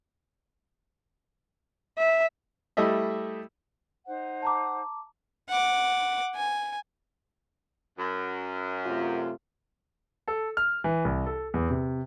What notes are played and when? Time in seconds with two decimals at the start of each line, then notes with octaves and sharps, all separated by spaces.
1.98 E5
2.77 G3 A3 E4 D#5 E5
4.07 D#4 C5 F#5
4.42 A5 A#5 D6
5.49 F#5 D6
6.35 G#5
7.99 F#2
8.86 C3 A3 F4
10.28 A4
10.57 F6
10.84 E3
11.05 C2
11.26 A4
11.54 E2
11.70 C3